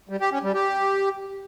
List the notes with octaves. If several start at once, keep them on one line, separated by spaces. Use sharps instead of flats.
G3
G4
C#4
G3
G4